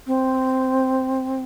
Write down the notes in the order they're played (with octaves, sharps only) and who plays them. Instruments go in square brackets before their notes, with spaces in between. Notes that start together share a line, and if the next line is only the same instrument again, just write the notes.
[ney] C4